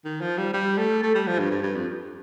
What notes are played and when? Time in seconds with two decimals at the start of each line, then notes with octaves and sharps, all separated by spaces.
0.05 D#3
0.21 F3
0.38 G3
0.54 G3
0.78 A3
1.03 A3
1.15 G3
1.27 F3
1.39 G2
1.51 G2
1.63 G2
1.76 F2